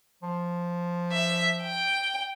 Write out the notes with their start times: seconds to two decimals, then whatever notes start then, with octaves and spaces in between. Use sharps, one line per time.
0.23 F3
1.12 E5
1.62 G5